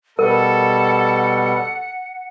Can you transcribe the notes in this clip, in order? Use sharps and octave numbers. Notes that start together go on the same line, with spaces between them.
B2 G3 A4 A#4 F#5